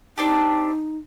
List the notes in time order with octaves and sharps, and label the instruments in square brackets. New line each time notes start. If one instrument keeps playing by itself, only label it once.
[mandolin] C4 D4 G4 [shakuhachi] D#4